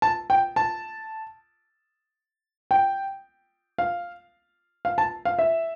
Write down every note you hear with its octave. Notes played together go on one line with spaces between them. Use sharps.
A5
G5
A5
G5
F5
F5
A5
F5
E5